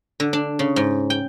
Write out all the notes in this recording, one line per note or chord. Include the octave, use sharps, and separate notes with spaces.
D3
D4
C#3
G#2
G5